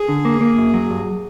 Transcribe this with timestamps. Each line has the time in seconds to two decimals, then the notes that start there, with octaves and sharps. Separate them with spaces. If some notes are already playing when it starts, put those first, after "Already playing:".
Already playing: G#4
0.08 D3
0.25 A#3
0.41 A#3
0.58 F#2
0.74 F#3
0.90 G2